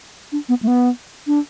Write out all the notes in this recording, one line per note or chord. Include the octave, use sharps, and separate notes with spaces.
D4
B3
A3
B3
D4